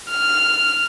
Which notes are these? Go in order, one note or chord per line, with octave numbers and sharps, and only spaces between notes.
F6